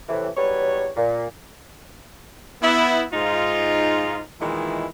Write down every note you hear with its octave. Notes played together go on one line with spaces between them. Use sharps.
A2 C3 E3
E2 F#3 G3 B4 C#5
A#2
B3 E4
G#2 D#4 F4
A#2 D#3 E3 G#3 B3 E4